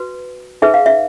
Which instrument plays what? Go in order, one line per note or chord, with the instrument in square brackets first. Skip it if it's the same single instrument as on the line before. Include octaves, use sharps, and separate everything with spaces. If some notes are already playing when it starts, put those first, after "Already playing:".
Already playing: [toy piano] F#4 B4
D#4 G#4 B4 E5
F5
E5